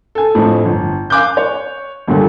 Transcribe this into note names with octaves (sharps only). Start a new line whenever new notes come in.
A4 G#5
F2 A2 F3 A3 D4 E4
G1
F5 G#5 D6 F#6 G6
C#5
G1 G2 A#2 D3 G3